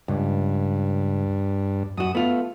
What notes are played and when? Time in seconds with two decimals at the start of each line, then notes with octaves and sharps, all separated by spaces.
0.08 C#2 G2
1.98 F#2 F#4 D#6
2.15 A3 B3 F4